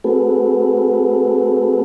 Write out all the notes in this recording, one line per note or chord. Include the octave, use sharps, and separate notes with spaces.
A3 C4 F#4 G#4 A4 B4